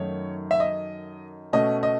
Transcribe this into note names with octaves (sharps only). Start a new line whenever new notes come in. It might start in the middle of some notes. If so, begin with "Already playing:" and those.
Already playing: F#2 D#3 A3 D#4 C#5
E5
D#5
B2 A3 C#4 D#5
D#5